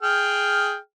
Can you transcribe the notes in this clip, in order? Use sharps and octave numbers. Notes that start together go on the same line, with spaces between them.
G#4 G5 F6